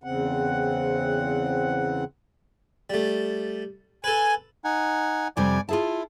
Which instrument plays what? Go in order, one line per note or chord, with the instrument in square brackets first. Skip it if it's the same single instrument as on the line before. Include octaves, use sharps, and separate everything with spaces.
[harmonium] E2 C#3 C4 F#5
[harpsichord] G3 A3
[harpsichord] A4 B4 [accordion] G#5
[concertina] D#4 F#5 G#5
[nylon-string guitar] F2 C3 G3 [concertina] D5 G#5
[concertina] E4 [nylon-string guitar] F4 G#4 A5